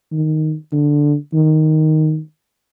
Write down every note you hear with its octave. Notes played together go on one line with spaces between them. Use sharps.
D#3
D3
D#3